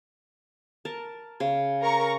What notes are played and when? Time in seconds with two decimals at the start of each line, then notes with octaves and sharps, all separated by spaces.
0.85 A#4 A5
1.40 C#3
1.82 A#4 A#5 C#6